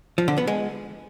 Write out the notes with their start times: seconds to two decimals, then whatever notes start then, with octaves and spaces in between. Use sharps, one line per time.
0.18 F3
0.28 D3
0.38 B3
0.47 G#3